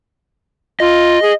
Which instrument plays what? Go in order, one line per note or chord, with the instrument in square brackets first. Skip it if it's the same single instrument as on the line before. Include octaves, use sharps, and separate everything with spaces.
[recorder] F4 [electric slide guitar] D#5
[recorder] G#4